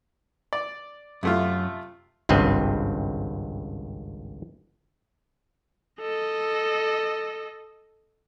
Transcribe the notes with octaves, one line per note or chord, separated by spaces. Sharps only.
D5
F#2 C3 A3 F4
G#1 C#2 G2 C4 D#5
A4 D#5